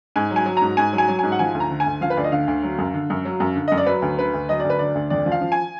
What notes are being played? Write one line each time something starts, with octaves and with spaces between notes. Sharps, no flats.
G#2 G#5
F#3
G#5
F#3
G#2 A#5
G#2 G#5
F#3
G#5
F#3
G#2 G#5
F#5
F3 G#5
D2
A#5
D3
G#5
D2
F3 F5
B4
D2 D5
D#5
D3 F5
D2
F#3
F#2
D3
F#2
F#3
F#2
D3
F#2 D#5
D5
F#3 B4
D2
D3 B4
D2
F#3 D#5
D2 D5
B4
D3 D5
D2
F2 D5
F3
F5
F3
G#5